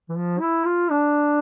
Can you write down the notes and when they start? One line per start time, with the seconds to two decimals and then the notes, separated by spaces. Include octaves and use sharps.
0.09 E3
0.16 F3
0.40 E4
0.65 F4
0.90 D4